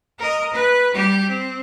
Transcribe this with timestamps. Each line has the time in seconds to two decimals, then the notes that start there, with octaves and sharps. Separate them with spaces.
0.19 A#4 D#5
0.54 B4
0.94 G3 G4
1.29 C4